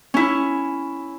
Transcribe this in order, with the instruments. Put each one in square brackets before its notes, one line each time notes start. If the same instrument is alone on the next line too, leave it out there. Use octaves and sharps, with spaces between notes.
[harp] C#4 E4